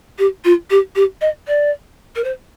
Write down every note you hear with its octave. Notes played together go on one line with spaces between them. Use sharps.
G4
F4
G4
G4
D#5
D5
A#4
C5